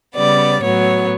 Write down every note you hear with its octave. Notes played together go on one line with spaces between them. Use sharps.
C#3 G3 B3 D5
A2 F#3 B3 C#5